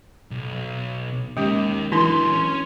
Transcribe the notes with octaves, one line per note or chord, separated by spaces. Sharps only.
B1
D#3 G#3 A#3 C#4 G4
E3 F#3 D4 E4 A4 C6
C#4